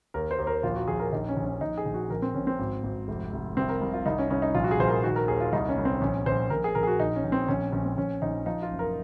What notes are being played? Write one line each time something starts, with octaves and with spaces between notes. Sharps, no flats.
D#2 A#4
C5
D#2
A#4
A#1 F4
F#4
A#1 G#4
A#4
A#1 D#4
C#4
A#1
C#4
A#1 D#4
G#4
A#1
F#4
A#1 A#4
C4
A#1 C#4
C4
G#1
G#1
F1
F1
C2 C4
A#4
C2
F4
C2 D#4
C#4
C2 C#4
D#4
A#1 F4
F#4
G#4
A#1 C5
A#4
D#3 F#4
A#4
D#2 G#4
F4
C2 D#4
C#4
C2
C4
A#1 C#4
A#1 C5
A#1 A#4
G#4
A#1 A#4
G#4
F#4
A#1 D#4
C#4
A#1
C4
A#1 C#4
A#1 C#4
C4
A#1 C#4
A#1 D#4
F3 D#4
F4
F#1
A#4